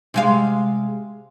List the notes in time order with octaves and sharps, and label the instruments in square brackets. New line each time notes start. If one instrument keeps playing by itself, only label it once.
[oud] C3 G#3 F5